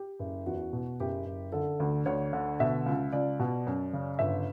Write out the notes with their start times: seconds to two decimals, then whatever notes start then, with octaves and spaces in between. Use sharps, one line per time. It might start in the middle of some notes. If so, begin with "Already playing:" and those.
Already playing: G4
0.19 F#1
0.46 E2 F#4
0.73 B2
1.00 F#1 G4
1.26 F#1
1.52 D3 A4
1.80 D2
2.06 D2 C#5
2.33 D3
2.60 B2 E5
2.86 C#2
3.13 C#2 D5
3.39 B2
3.67 F#2
3.93 C#3
4.19 G1 E5